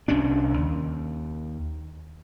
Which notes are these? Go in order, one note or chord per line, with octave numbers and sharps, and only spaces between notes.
C2 C3 C#4 D4
D#2